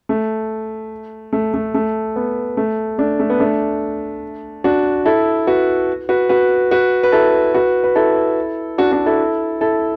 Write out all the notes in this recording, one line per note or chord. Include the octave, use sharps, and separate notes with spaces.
A3
A3
A3
A3
B3
A3
A3 D4
A3
B3
A3 D4
D4 F#4
E4 A4
F#4 B4
F#4 B4
F#4 B4
F#4 B4
B4
E4 A4
F#4 B4
B4
E4 A4
D4 F#4
D4 F#4
E4 A4
E4 A4